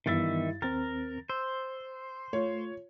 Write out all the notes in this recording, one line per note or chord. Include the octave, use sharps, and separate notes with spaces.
G2 D#3 E3 B3 E4 E5 A6
D#2 C4 A#4 A6
C5 E6
A3 F4 C#5